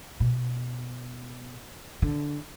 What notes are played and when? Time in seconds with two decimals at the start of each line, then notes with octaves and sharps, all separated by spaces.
0.20 B2
2.02 D3